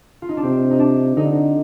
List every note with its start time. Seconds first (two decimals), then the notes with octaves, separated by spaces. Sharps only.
0.22 F4
0.29 D#4
0.37 D4
0.43 C3 C4
0.71 D#4
0.79 D4
1.17 D3 D#4